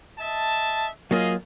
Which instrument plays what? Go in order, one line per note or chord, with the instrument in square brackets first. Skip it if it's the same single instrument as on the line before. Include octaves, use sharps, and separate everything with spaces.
[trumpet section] D#5 E5 A5
[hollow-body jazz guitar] F#3 A#3 F4 [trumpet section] G#4 D#5 F5